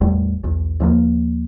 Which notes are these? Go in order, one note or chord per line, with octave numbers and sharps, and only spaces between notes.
A1 E2 G3 A3
B1 E2
D#2 F3 F#3 A#3